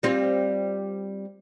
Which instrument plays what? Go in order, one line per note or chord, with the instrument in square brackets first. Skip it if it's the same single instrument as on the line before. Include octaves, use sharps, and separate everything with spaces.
[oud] G3 C4 F4